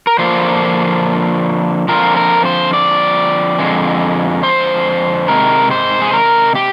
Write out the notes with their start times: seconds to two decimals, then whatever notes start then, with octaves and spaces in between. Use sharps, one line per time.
0.07 A#4
0.18 D3 F3 A#3 D4 F4 C5
1.88 D3 F3 C4 F4 A#4
2.17 A#4
2.45 C5
2.73 D5
3.58 F2 D3 G#3
4.43 C5
5.28 C3 D#3 G#3 A#4
5.71 C5
6.02 G#4
6.13 A#4
6.55 G4